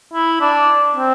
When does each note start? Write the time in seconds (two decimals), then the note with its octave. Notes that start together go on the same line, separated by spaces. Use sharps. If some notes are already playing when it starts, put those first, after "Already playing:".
0.13 E4
0.41 D4
0.96 C4